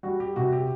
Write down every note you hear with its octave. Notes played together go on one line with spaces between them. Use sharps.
G3 F#4
G4
C3 F#4
G4